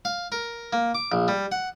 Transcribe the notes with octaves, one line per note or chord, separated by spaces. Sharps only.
F5
A#4
A#3
D6
A#1
G3
F#5